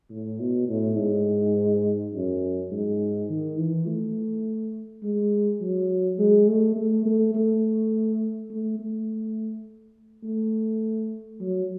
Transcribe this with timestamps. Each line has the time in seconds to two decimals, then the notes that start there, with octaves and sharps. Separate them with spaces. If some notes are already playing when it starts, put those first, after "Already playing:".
0.11 A2
0.40 B2
0.69 A2
0.98 G#2
2.14 F#2
2.71 G#2
3.29 D#3
3.58 E3
3.87 A3
5.03 G#3
5.61 F#3
6.18 G#3
6.48 A3
6.76 A3
7.05 A3
7.35 A3
8.51 A3
8.79 A3
10.24 A3
11.40 F#3